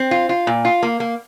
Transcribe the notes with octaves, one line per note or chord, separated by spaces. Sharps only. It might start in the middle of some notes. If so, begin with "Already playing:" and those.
Already playing: C4
F4
F4
A#2
F4
A#3
A#3